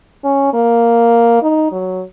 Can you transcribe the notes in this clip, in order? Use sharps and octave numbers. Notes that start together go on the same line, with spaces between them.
C#4
A#3
D#4
F#3